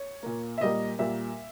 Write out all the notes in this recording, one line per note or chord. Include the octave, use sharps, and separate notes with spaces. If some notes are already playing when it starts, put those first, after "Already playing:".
Already playing: C#5
A#2 A#3
E5
A#2 G3 A#3 D#5
A#2 G3 A#3 E5